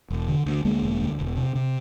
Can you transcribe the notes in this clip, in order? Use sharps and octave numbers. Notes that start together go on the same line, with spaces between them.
E1
D3
D2
D2 G#3 A#3
E1
D2
E1
C3
C3